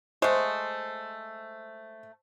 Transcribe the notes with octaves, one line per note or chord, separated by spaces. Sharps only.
G#3 A3 C5